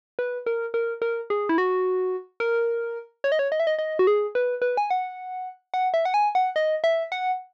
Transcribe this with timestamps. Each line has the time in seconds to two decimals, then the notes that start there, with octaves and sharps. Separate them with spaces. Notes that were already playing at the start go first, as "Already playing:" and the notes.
0.19 B4
0.46 A#4
0.74 A#4
1.02 A#4
1.30 G#4
1.49 E4
1.58 F#4
2.40 A#4
3.24 C#5
3.32 D#5
3.39 C#5
3.52 D#5
3.60 E5
3.67 D#5
3.79 D#5
3.99 F#4
4.07 G#4
4.35 B4
4.62 B4
4.77 G#5
4.91 F#5
5.74 F#5
5.94 E5
6.05 F#5
6.14 G#5
6.35 F#5
6.56 D#5
6.84 E5
7.12 F#5